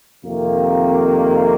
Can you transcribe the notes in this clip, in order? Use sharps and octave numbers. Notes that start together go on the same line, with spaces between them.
F2 C3 D#3 A#3